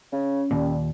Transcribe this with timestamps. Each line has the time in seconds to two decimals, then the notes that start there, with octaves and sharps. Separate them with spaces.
0.13 C#3 C#4
0.51 D#2 A#2 G3